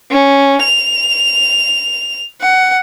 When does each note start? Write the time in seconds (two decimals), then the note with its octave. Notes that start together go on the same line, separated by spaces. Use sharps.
0.11 C#4
0.63 F7
2.41 F#5